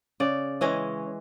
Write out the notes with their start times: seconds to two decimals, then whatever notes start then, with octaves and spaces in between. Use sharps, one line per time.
0.20 C#3 D5
0.61 E3 G#3 C#4 D#5